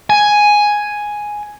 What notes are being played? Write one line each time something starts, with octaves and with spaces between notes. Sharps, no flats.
G#5